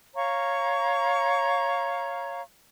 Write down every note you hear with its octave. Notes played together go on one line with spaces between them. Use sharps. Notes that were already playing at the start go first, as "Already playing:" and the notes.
C#5 F5 A#5 C#6